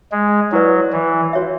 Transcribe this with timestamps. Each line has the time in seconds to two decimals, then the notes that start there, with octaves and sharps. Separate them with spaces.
0.12 G#3
0.52 F#3 E4 B4 D5
0.93 E3
1.33 F#4 C#5 E5